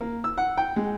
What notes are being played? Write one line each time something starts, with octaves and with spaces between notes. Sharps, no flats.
A#3
E6
F#5
G5
G#3